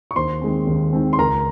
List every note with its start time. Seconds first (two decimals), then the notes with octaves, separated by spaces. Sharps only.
0.11 C#6
0.16 D#2 C5 C6
0.42 D#3 G#3 C4
0.67 D#2
0.93 D#3 G#3 C4
1.13 C6
1.19 C#2 A#4 A#5